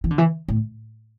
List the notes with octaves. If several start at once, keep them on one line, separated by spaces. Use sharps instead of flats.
E3
D3
E3
A2